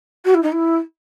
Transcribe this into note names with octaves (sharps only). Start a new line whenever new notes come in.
F#4
E4
D#4
E4